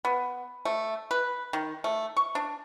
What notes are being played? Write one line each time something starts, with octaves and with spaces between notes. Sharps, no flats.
B3
A3
B4
D#3
A3
C#6
D4